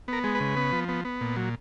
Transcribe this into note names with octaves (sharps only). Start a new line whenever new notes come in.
B3 A#4
G#3
B4
C#3
B3
F3
B3
B3
A#2
F#3